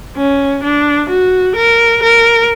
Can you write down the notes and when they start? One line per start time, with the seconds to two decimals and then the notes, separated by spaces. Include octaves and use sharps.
0.17 C#4
0.64 D4
1.09 F#4
1.55 A#4
2.02 A#4